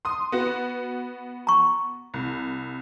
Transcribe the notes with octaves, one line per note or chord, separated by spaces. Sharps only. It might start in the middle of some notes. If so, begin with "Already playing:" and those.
C6 D#6
B3 F#4
A#5 C#6
C2